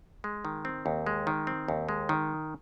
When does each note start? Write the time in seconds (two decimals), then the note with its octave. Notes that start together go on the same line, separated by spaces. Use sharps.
0.24 G#3
0.45 D#3
0.65 C4
0.86 D#2
1.06 G#3
1.27 D#3
1.47 C4
1.68 D#2
1.89 G#3
2.09 D#3